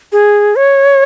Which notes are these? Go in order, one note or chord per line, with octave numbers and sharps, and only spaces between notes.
G#4
C#5